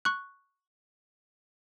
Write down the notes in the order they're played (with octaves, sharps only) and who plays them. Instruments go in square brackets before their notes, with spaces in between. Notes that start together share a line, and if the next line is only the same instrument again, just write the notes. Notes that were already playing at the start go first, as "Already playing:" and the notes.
[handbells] C#6 F#6